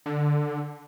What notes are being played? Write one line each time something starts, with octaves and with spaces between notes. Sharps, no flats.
D3